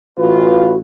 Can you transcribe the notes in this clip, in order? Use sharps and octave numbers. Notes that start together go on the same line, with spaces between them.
A1 E3 F4 F#4 B4